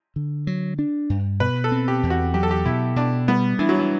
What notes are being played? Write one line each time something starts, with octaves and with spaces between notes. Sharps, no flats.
D3
F#3
D4
G2
B2 B4
A4
C4
G4
E2
F#4
F#3 G4
A4
G4
B2 E4
B2 D4
G3 B3
E3 D4
F#3
E3